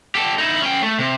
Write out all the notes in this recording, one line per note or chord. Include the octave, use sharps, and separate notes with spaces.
G4 A4
D#4 E4
C#4 G5
A3
C3